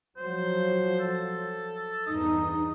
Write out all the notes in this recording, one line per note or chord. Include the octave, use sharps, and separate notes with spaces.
F3 F#3 C5
A4
E2 G2 D#4 D#5